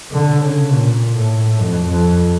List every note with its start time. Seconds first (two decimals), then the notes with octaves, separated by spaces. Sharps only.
0.11 D3
0.41 C#3
0.71 A#2
1.15 A2
1.61 F2
1.90 F2